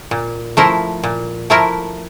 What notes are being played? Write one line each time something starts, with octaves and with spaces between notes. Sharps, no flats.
A#2
F3 A3 E4 A#4
A#2
F3 A3 E4 A#4